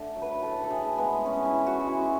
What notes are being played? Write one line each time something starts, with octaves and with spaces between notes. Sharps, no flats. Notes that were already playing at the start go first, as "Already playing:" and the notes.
Already playing: D3 A3
F#3
B4
A2 A4
A4
E3 G#4
G#3 B3
G#3 C#4
E4
E3
F#4
G#3
E4